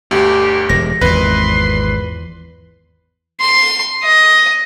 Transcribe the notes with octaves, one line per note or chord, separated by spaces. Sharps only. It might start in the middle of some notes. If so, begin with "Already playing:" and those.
G1 D2 G4
E1 A2 A#6
G#1 E2 A#2 B4 C6
C6
D#5